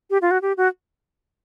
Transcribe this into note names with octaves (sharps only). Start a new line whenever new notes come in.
G4
F4
F#4
G4
F#4